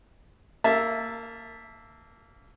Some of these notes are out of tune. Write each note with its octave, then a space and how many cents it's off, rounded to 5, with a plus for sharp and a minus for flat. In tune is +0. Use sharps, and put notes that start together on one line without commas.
A#3 -20 E5 +0 A5 +0